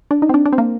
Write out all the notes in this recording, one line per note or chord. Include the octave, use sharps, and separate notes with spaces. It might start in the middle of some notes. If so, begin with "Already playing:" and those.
D4
D#4
C4
D4
D4
C4
A#3